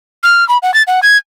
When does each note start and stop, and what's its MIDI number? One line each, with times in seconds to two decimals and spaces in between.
0.23 0.47 89
0.49 0.58 83
0.62 0.74 78
0.74 0.83 93
0.87 1.00 78
1.03 1.17 92